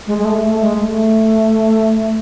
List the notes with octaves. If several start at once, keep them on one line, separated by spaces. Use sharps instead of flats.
G#3
G#3
A3
A3
G#3
A3